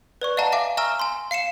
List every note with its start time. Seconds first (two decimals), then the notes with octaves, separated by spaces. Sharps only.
0.21 B4 D5 C#6
0.37 D#5 F5 F#5 A5 A#5
0.52 E5 F5 G#5 D6
0.77 E5 G#5 A#5 C#6 E6 F6
0.99 G#5 C6
1.31 F5 C7 C#7 E7